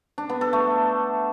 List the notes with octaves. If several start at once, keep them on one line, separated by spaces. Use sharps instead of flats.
D4
B3
A4
A3